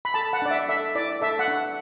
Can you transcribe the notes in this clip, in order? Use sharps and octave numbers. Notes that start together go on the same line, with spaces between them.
B5
A4 A5
F#5
D4 D5
E5
A4 E5
E4 D5
A4 E5
F#5
D4